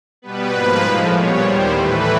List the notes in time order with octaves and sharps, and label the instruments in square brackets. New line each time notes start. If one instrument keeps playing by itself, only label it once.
[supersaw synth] B2 G3 B3 B4
G#2 F3 A#3
A2 F3 G#3
A#2 G3 B3 C#5
D#2 D#3 G3 C5
A2 E3 A3 B4